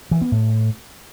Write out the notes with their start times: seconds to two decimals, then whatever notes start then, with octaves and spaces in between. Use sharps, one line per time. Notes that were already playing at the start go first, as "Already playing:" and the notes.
0.11 E3
0.22 B3
0.32 A2